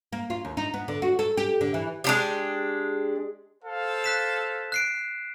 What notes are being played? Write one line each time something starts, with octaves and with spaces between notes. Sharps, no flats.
A#3
F4
D#2
D#4
B3
D3
F#4
A4
G4
D3
E3
G#3 D4 G4
A4 C5 F5
F#6 B6 E7
F#6 C7 D7